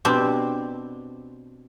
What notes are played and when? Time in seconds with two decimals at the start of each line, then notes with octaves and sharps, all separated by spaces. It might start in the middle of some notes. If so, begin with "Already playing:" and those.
0.05 B2 C4 D4 G4